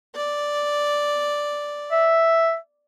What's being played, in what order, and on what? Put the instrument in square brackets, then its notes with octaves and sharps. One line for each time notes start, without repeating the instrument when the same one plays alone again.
[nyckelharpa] D5
[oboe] E5